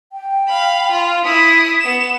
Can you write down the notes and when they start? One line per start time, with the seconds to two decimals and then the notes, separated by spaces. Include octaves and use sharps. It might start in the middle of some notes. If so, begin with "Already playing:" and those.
0.13 G5
0.48 F5 B5
0.91 F4
1.25 E4 D#6 B6
1.81 B3 E7